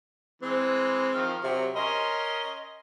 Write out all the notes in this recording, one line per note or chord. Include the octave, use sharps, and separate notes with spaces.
E3 G#3 C4
D#3 F3 F6
C3 F#3
C#4 A#4 D#5 C6